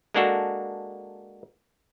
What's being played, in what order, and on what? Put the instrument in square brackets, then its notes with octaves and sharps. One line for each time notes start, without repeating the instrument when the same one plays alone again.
[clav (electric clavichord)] G#3 A#3 D4 F#4 A4